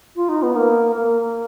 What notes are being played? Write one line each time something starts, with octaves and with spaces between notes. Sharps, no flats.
F4
D#4
B3
A#3
A#3